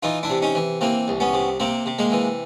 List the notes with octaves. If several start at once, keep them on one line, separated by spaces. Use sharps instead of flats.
E3 D#4 F4
D4 E4
C3
C#4 D#4
E3
E3 A#3 C4
C2
B3 C#4
C3
C3 A#3 C4
C3
G#3 A#3
E3